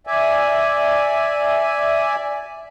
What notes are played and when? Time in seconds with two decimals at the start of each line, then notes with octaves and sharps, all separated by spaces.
0.07 D5 E5 G#5